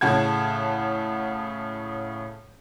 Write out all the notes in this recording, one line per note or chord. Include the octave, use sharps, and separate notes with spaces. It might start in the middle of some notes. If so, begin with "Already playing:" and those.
A2 C#3 F#5 A5 G#6